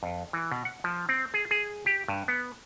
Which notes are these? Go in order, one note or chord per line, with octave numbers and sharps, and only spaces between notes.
F2
E3
B2
F#5
F3
C4
G#4
G#4
G4
G2
B3